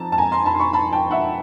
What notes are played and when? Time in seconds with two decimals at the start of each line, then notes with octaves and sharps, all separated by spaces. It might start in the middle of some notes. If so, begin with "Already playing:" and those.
Already playing: F2 A5 A#5
0.12 A5
0.18 G#5 A#5
0.32 A#5 C6
0.46 A5 B5
0.54 C6
0.60 B5 C#6
0.73 A5 B5
0.92 G5 A5
1.11 E5 F#5